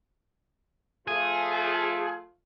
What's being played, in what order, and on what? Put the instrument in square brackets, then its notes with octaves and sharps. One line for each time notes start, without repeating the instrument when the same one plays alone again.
[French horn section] F3 A3 F4 [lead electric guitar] G#4